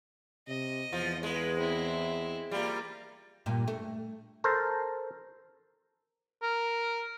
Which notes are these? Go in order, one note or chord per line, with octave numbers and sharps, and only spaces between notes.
C3 D#5
E2 F3
G#3 B4
C4 E4
G3 A#3 F4
G2 A#2
A3
A4 A#4 C5
A#4